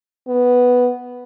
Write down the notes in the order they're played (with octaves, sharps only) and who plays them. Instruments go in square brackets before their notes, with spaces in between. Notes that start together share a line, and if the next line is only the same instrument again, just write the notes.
[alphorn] B3